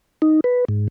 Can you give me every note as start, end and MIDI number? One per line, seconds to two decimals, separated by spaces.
0.22 0.40 63
0.44 0.65 71
0.68 0.88 44